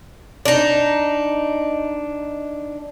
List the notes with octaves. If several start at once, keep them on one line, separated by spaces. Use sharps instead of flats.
D4 D#4